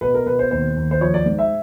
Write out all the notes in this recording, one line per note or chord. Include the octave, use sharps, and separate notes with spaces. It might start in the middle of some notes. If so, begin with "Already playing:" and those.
B2 B4
A#4
B2 B4
C5
D#2 C5
D#2
C5
F3 C#5
D5
G#2
E5